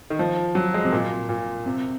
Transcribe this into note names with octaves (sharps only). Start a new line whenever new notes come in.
D#3
F3
F#3
G#3
C3
A#2
A#2
C3